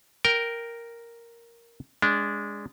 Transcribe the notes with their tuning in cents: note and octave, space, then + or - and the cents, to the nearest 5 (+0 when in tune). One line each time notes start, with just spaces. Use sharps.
A#4 +0 G5 +0
G#3 -10 D4 -20